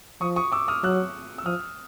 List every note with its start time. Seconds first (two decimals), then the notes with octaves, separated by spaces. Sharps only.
0.21 F3 C#6 D#6
0.36 C#6 D#6
0.52 D6 E6
0.68 D#6 F6
0.83 F#3 E6 F#6
1.38 E6
1.45 F3 D#6 F6